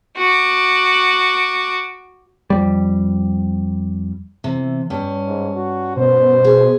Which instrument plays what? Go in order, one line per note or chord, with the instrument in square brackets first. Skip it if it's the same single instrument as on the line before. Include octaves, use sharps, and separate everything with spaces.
[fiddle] F#4 D6
[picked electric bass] F2 G3
[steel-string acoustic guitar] C3 E3
G2 C#4
[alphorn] G#2
F#4
[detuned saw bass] B2 [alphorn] C5
[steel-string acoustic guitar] G#4